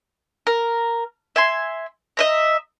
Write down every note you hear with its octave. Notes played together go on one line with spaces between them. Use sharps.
A#4
E5 G#5 C6
D#5 E5 A#5